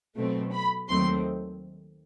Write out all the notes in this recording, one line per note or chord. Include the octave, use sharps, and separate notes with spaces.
B2 F#3 A3 C4
B5
D#2 D#3 F#3 A3 C4 C6